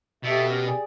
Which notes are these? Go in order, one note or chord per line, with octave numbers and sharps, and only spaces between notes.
B2 G4 A4 E5
C#4 G4 A#4
G4 G#4 D5